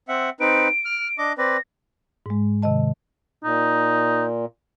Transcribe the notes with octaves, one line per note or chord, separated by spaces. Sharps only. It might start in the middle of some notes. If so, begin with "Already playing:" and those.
C4 E5 F#5
C4 D#4 B4 D7
F6
D4 D#5 D6
C4 B4 D5 A#6
G#2 G#3
C3 D#3 D#5 A5
A#2 D#4